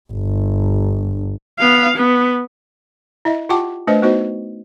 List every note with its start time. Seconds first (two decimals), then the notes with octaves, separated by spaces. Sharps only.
0.12 G1
1.59 B3 F5
1.96 B3
3.25 E4 D#5 E5
3.49 F4 G4 F#5 G5 A5 D6
3.87 A3 D4 B4 C5 D#5
4.02 B3 D#4 F#4 C5 D#5